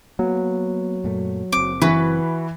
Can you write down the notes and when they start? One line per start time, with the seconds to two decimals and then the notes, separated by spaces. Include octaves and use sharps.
0.19 F#3 A#3 B3
1.04 F#2 A#2 A3
1.52 F#1 C4 D6
1.82 E3 F#4 B4